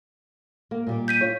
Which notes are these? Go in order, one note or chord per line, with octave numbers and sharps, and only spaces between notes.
A#3
A#2 G3 A#3
G6 B6 D#7
F4 C#5